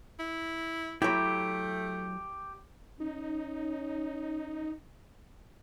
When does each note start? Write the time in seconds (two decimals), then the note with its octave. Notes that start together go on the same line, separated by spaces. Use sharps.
0.19 E4
1.02 F#3 A3 E4 G4
3.00 C#4 D#4